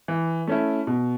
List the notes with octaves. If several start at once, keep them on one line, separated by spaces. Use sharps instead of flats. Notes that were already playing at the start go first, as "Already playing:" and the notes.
E3
A3 C#4 E4
B2